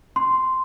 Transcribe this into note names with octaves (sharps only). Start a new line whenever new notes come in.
C6